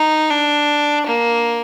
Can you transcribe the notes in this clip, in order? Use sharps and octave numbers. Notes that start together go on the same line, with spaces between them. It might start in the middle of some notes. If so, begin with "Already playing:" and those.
Already playing: D#4
D4
A#3